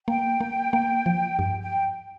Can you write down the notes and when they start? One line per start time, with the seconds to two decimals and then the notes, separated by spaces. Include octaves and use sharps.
0.08 A#3 G5
0.41 A#3
0.73 A#3
1.06 F3
1.39 G2 G5
1.61 G5